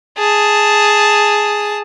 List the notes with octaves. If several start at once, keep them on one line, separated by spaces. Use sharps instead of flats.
G#4 A5